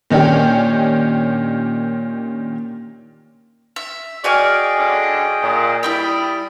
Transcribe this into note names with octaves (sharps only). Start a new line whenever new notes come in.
A#2 D#3 C#4 D4 G4
E5
F#4 G#4 D5 D#5 G5 G#5 F6
D3 C#4 D4
A#2
G3 E4 D5 D#5 G5 B5